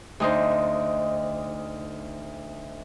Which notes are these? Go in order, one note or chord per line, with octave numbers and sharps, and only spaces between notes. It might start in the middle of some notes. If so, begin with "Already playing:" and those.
D2 D#4 C5